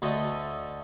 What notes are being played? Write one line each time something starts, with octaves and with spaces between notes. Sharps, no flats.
D2 A3 D#5 E5